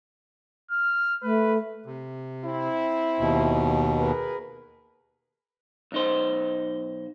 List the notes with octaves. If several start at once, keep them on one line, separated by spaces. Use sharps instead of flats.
F6
A3 B4
C3
C4 E4
D#2 B2
G#4 A#4 B4
B1 D#4 C5